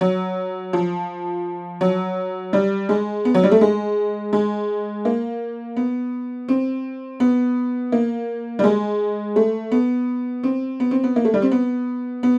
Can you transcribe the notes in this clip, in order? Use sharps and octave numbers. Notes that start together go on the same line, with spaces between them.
F#3
F3
F#3
G3
G#3
B3
F#3
G3
A3
G#3
G#3
A#3
B3
C4
B3
A#3
G3
G#3
A3
B3
C4
B3
C4
B3
A#3
A3
G3
C4
B3
B3